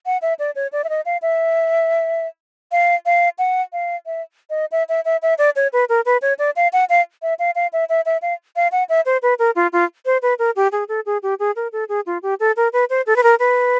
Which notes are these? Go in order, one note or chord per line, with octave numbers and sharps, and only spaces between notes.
F#5
E5
D5
C#5
D5
E5
D#5
F5
E5
F5
F5
F#5
F5
E5
D#5
E5
E5
E5
E5
D5
C#5
B4
A#4
B4
C#5
D5
F5
F#5
F5
E5
F5
F5
E5
E5
E5
F5
F5
F#5
E5
C5
B4
A#4
F4
F4
C5
B4
A#4
G4
G#4
A4
G#4
G4
G#4
A#4
A4
G#4
F4
G4
A4
A#4
B4
C5
A4
B4
A#4
B4